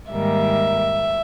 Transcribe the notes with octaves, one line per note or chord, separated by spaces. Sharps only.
G#2 D#3 G3 A#3 E5